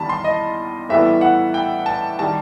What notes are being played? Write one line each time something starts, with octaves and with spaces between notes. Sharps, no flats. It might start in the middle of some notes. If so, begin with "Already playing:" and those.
Already playing: E2 D#3 G3 A5 B5
C6
D#5
A2 E3 G3 B3 E5
F#5
G5
A5
D#3 G3 A5